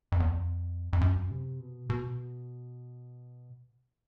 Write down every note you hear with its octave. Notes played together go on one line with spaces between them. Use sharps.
F2
E2
F2
F2
F#2
C3
B2
B2